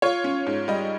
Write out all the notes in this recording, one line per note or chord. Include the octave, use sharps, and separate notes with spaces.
F4 C#5
C#4
G#2
G3 D#5